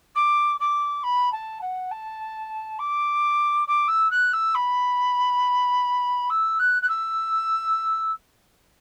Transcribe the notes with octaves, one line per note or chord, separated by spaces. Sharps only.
D6
D6
B5
A5
F#5
A5
D6
D6
E6
F#6
E6
B5
E6
F#6
F#6
E6